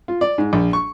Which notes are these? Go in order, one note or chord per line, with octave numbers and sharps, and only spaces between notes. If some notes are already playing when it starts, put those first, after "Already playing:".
F4
D5
G#2
A#1
C#6